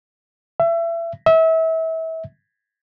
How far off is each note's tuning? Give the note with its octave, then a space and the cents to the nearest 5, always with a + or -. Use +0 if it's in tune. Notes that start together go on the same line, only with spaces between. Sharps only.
E5 +30
E5 -30